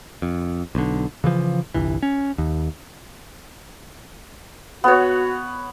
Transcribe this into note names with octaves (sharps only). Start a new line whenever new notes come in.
F2
B1 D3
C#3 E3 F3
G1 C2 E3
C#4
D#2
B3 F#4 C#5